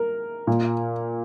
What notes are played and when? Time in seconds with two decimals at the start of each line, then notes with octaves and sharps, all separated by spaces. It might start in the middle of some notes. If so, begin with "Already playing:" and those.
Already playing: A#4
0.47 A#2